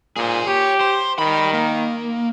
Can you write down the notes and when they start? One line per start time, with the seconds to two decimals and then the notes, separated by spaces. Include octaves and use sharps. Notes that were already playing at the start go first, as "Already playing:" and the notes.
0.17 A#2 G#4 C5
0.47 G4 C#5
0.81 C5
1.19 D#3 G3 B5
1.53 A#3